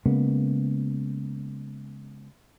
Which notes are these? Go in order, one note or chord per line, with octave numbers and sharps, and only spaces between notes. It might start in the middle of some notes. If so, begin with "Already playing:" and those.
C#3 G#3 A#3 B3